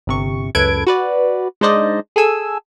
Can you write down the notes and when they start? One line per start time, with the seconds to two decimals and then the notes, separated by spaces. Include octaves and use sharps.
0.07 G1 C3 C#6
0.55 C#2 F#2 A4 B4 G#6 D7
0.87 F#4 B4 D5
1.61 G#3 D4 D#4 C5 D5 D#5
2.16 G#4 A4 G#5 E6